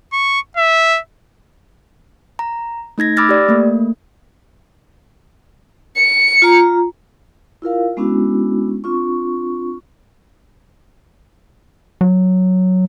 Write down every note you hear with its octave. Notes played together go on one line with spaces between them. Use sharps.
C#6
E5
A#5
A3 D#4 G#6 A#6
B5 D6 E6 F6 A6 A#6
G4 D5
A3 A#3
C#7
F4 A#5
E4 F4 A#4 F5
G#3 B3 C#4 D4 E4 F#4
C4 D4 F4 C#6
F#3